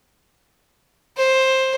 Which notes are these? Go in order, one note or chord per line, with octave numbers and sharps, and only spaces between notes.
C5